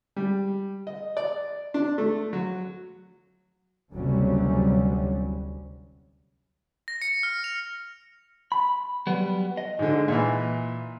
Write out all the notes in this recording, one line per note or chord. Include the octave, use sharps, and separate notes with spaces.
G3
D#5
D5
D4
A3
F#3
F#1 D2 C3 F#3 G3 C#4
A#6
C#7
F6
F7
B5
F#3 G3 B3
D#5
G#2 D3
A#2 E3